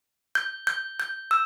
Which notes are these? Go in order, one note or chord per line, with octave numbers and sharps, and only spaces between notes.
G6
G6
G6
E6